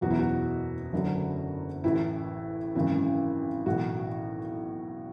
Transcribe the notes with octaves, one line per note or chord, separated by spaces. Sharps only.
F#1 E2 B2 F#3 F#4
E4
F#4
F#1 F#2 D3 F#3
A1 A2 E3 E4
G#1 F#2 C#3 E3
B1 A2 E3 F#4